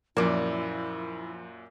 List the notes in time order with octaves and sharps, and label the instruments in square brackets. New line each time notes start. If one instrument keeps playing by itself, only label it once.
[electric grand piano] F#2 A#2 [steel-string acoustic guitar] F3 [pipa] A#3 D5 [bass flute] E4